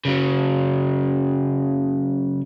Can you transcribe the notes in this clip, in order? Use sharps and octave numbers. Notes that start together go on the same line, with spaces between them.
C#3 F#3